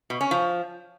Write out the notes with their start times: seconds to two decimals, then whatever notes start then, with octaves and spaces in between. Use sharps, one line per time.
0.10 B2
0.21 C#4
0.31 F3